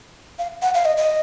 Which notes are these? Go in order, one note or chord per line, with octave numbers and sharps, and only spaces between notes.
F5
F#5
F5
D#5
D#5